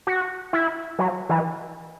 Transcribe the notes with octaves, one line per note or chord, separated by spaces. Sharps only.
F#4
E4
F#3
E3